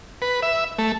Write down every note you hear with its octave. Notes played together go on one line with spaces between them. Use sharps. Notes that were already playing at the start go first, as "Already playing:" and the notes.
B4
E5
A3